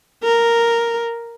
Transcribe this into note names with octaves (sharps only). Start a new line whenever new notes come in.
A#4